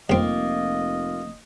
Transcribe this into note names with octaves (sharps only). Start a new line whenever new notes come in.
F1 C2 A#3 C4 F4 D#5